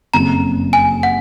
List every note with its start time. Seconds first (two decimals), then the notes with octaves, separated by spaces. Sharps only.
0.14 F#1 F2 C#3 F#3 A#5
0.73 G#5
1.03 F#5